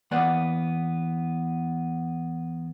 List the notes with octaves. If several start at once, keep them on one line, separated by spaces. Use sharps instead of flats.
E2 A#3 B3 D5 F#5